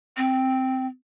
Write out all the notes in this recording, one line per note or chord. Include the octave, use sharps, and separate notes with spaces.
C4